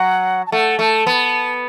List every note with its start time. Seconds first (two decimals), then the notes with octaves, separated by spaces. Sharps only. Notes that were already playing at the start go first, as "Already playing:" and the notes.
Already playing: F#3 F#5
0.47 A5
0.52 A3 F#5
0.79 A3 A5
1.06 B3